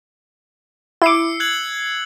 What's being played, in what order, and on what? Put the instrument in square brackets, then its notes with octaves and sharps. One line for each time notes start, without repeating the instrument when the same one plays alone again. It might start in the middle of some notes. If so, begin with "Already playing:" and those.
[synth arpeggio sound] E4 D6 [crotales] E6 C7 C#7
[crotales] F#6 G#6 F#7